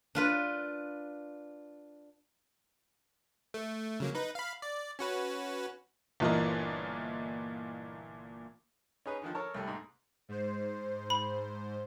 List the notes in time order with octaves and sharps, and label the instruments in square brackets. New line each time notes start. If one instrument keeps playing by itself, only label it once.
[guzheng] D4 F4 B4
[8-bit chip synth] A3
C#3 F#3 A#3
D#4 B4
F5 B5
D5
C#4 F#4 B4
[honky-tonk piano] G1 A#2 E3 F4 A#4 D#5
[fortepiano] C#4 D#4 G#4 B4
D3 D#3 F3
A4 A#4 C#5 A5
C2 G3 A3
G#2 D#4
[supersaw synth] G#2 C5
[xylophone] B5